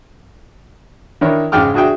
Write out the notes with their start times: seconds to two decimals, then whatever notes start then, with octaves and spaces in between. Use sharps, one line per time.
1.21 D#3 D4 E4 A#4 C#5
1.52 G#2 C#3 G#3 G5 D6 F6
1.74 D4 F#4 G#4 E5 G5